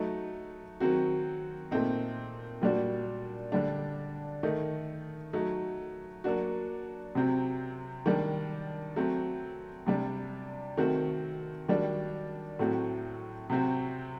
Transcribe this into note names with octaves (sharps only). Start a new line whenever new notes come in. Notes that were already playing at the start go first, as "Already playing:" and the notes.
Already playing: F#3 A3 D#4
D#3 F#3 C4 F#4
A#2 A3 C4 D#4
A#2 G3 D4 F#4
D3 G3 D4
D#3 A3 D#4
F#3 A3 D#4
F#3 A#3 D4 F#4
C3 F#3 C4
D#3 G3 D4
F#3 A3 C4
C3 G3 D4
D#3 A3 C4 F#4
D#3 G3 D4 F#4
A2 F#3 A3 C4 F#4
C3 F#3 C4 F#4